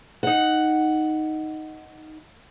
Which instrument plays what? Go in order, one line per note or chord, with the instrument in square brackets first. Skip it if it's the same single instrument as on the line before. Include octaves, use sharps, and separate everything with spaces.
[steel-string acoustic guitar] D#4 F#5